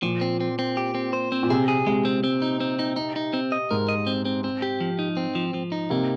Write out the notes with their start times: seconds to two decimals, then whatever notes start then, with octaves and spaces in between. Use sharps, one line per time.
0.03 A#2 F3
0.21 C4
0.40 C4
0.59 C4
0.77 G4
0.95 C4
1.13 C5
1.32 C4
1.43 A#2
1.50 C3 G#4
1.68 G#4
1.87 C3 G#3
2.05 C4
2.24 C4
2.42 D#4
2.60 C4
2.79 D#4
2.96 D#4
3.16 D#4
3.34 C4
3.52 D#5
3.71 G#2 A#4
3.89 D#5
4.07 C4
4.25 C4
4.44 C4
4.62 G4
4.80 F3
4.99 D#4
5.17 C4
5.35 F3
5.54 F3
5.72 D#4
5.90 C3 A#3